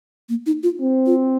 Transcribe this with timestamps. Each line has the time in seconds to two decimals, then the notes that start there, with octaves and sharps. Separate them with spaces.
0.29 A#3
0.46 D#4
0.63 F4
0.80 C4
1.06 F4